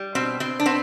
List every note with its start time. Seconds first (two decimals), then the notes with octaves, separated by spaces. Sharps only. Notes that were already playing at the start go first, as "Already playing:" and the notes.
Already playing: G3
0.15 B2 C4
0.40 B2 C4
0.60 D4
0.66 B3 C4